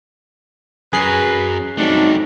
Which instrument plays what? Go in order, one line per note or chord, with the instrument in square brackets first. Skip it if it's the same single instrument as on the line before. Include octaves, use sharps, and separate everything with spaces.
[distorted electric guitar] F#2 F#3 [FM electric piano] G#4 C7 [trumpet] B4
[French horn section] F#3 C4 D#4 [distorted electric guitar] G3 A3 [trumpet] D4